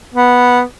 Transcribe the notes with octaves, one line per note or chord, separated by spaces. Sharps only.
B3